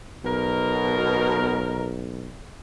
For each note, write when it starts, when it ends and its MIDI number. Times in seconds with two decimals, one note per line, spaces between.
0.24 2.31 35
0.24 1.87 47
0.24 1.87 70